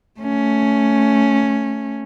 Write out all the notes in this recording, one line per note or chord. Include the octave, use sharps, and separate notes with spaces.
A3 C#4